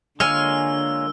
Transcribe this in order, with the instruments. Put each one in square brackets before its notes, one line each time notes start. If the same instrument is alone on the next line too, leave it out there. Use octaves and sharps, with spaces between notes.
[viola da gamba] D3 [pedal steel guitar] G#3 A#3 F4 [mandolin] C#5 G#5 F6 [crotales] E6